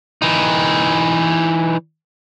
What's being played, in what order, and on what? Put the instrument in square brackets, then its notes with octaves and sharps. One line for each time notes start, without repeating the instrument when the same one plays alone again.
[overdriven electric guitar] E3 D#4